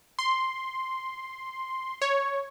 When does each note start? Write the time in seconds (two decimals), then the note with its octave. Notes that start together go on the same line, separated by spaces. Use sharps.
0.19 C6
2.02 C#5